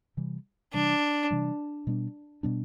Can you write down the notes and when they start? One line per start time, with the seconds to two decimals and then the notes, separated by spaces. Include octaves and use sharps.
0.17 C3 E3 G3
0.74 C3 E3 G3 D4
1.31 C3 E3 G3
1.87 B2 G3 B3 D4
2.43 B2 G3 B3 D4